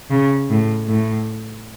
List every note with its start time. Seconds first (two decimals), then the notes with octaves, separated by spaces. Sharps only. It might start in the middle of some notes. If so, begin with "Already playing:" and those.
0.10 C#3
0.50 A2
0.88 A2